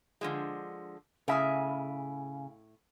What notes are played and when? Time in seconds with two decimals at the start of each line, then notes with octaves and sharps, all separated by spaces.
0.21 D3 F3 G#3
1.28 A2 C#3 E5 G#5